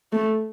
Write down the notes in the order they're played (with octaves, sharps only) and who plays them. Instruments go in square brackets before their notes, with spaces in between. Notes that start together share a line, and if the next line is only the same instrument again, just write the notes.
[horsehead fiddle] A3